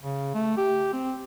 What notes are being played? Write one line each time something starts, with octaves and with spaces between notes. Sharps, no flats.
C#3
A3
G4
C4